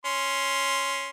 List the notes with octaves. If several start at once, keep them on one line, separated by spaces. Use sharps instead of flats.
C#4 C6